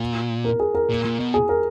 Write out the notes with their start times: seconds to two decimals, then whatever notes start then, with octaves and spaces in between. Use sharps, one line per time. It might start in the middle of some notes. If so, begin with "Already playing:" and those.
Already playing: A#2
0.45 A#4
0.60 G#4
0.75 A#4
0.90 A#2
1.05 A#2
1.20 B2
1.34 G#4
1.49 A#4